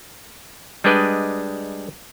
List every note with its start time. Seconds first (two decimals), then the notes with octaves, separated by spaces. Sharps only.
0.84 G3 G#3 D4 B4 D5 D#5